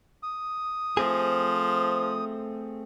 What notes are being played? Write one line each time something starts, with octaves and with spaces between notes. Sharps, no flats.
D#6
F3 A3 C4 G#4